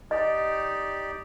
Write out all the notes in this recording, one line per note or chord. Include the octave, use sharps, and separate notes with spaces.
D#4 G4 D5 D#5